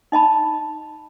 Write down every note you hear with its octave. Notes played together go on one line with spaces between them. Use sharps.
D#4 D#5 A5 B5